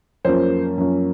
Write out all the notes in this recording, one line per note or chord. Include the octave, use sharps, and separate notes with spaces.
F#2 F3 A#3 C#4 C5
F#2 F3 A#3 C#4